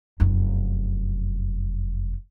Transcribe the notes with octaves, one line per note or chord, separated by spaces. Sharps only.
F1 F#2